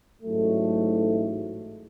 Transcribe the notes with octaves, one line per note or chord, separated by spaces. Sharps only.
A1 G#2 F#3 A3